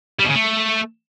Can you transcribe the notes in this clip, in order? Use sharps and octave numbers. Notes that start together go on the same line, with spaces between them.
G3
B2
C#3
A3